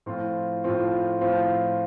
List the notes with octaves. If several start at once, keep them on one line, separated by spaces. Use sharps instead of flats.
A2 F3 C4 F4
A2 F3 C4 F4
A2 F3 C4 F4